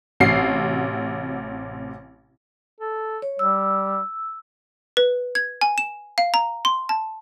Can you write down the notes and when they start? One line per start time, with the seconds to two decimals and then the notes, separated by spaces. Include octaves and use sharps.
0.20 A1 C3 C4 F#4 C7
2.81 A4
3.22 C#5
3.39 G3 E6
4.97 B4
5.35 G#6
5.61 G#5
5.78 E7
6.18 F5
6.34 A#5
6.65 C6
6.89 A5